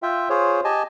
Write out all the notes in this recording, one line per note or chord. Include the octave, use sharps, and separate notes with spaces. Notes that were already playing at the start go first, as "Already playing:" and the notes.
F4 E5 G5
F4 G#4 C5 C#5
G4 D#5 G#5 A5